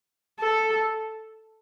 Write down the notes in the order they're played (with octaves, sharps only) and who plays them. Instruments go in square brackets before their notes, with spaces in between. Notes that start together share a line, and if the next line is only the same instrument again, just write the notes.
[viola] A4